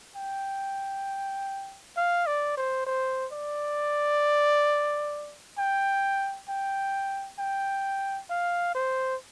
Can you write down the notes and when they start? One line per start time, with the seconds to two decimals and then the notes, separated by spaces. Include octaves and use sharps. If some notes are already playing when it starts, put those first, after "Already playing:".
0.16 G5
1.97 F5
2.26 D5
2.57 C5
2.86 C5
3.32 D5
5.58 G5
6.49 G5
7.39 G5
8.30 F5
8.75 C5